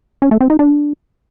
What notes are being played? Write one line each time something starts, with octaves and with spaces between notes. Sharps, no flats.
C#4
A3
C4
D#4
D4